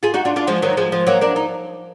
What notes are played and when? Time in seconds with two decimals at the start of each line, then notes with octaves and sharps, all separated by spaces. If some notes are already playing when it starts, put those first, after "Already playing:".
0.03 F4 G#4
0.14 D#4 F#4
0.25 D4 F4
0.36 D4 F4
0.47 F3 G#3
0.62 D#3 F#3
0.77 F3 G#3
0.92 F3 G#3
1.07 F#3 A#3
1.21 A#3 D4
1.36 D#4